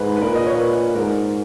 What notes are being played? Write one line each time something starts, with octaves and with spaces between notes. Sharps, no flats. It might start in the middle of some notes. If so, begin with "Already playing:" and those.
Already playing: G#2 B4
B4
A#2 A#4
D#5
C#5
B4
G#2 A#4